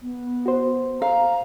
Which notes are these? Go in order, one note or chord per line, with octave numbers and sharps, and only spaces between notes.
B3
F#4 C5
F5 A#5